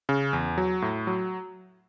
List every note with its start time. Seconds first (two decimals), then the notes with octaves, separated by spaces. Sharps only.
0.09 C#3
0.33 E2
0.58 F#3
0.82 A2
1.07 F#3